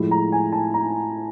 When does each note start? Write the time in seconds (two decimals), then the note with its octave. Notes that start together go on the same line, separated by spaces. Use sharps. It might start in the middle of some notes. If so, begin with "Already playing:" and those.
Already playing: A2 F3 G#3
0.11 A#5
0.32 G#5
0.52 A5
0.74 A#5